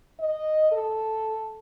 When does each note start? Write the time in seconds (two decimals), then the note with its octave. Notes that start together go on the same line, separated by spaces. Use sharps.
0.19 D#5
0.72 A4